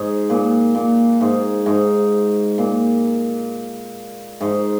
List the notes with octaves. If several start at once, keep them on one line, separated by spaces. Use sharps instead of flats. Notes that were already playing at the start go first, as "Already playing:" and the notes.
Already playing: G#2
A#2
A#2
G#2
G#2
A#2
G#2